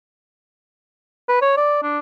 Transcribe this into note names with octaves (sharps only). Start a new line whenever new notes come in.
B4
C#5
D5
D4